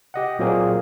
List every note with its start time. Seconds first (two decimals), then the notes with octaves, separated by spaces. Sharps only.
0.14 G4 D#5 F#5
0.39 A#2 F#3 A#3 C4 G#4